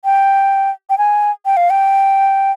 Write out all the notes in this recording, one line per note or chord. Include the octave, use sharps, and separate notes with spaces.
G5
G5
G#5
G5
F5
G5